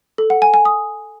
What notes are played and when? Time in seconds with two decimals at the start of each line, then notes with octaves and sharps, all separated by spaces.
0.18 A4
0.30 F#5
0.42 G#5
0.54 G#5
0.65 D#6